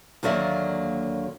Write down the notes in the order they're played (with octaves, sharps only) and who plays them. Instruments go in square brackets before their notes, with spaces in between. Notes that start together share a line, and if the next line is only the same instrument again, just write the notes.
[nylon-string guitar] D#2 D3 F#3 A#3 D5 E5